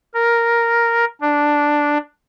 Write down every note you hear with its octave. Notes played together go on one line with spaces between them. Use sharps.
A#4
D4